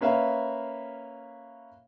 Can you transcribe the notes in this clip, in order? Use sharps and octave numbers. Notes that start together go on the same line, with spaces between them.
A#3 C#4 B4 E5 F5